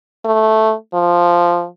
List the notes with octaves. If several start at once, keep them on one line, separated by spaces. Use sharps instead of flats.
A3
F3